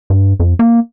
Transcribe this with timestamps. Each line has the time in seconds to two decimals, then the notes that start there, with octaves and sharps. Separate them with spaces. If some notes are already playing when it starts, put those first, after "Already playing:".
0.10 G2
0.40 F2
0.59 A#3